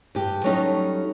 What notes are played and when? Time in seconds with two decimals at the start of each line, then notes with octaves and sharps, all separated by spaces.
0.15 G2 G4
0.44 F#3 G3 A3 C#4 D#4